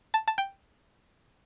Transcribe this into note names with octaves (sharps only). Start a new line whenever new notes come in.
A5
A5
G5